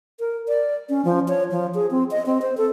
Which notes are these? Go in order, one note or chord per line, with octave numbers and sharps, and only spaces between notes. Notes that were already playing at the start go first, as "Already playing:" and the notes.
A#4
D5
C#4
F3
C#5
F3
G#4
C4
D#5
C4
C5
A4